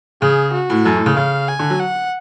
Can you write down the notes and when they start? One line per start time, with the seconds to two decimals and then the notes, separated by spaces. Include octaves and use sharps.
0.22 C#3 G#4
0.53 F#4
0.70 A2
0.85 F#2 A4
0.96 A2
1.06 C#3
1.17 C#3 F5
1.49 G#5
1.59 D3
1.70 F#3
1.80 F#5